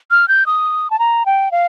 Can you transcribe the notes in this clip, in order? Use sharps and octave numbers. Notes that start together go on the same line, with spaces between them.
F6
G6
D#6
A5
A#5
G5
F5